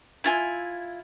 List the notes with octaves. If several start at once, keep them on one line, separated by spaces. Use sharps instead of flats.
E4 F4 G#5